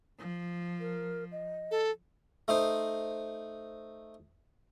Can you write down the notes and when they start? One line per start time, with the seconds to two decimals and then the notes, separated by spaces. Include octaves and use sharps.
0.19 F3
0.80 A#4
1.32 D#5
1.71 A4
2.48 A3 D#4 C5